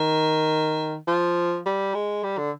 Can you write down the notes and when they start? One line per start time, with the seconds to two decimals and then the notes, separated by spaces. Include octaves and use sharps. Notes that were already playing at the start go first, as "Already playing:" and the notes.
Already playing: D#3
1.07 F3
1.66 G3
1.94 G#3
2.23 G3
2.38 D3